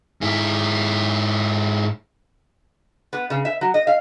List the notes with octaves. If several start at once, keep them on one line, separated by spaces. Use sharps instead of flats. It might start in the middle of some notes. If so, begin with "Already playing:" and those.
G#2 E4
B3
C#3
E5
F#3
D#5
F5